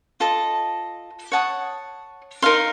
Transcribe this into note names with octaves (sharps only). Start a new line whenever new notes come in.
F4 A4 D#5 A5
C#5 F#5 A5 D#6
D#4 A#4 F5 C6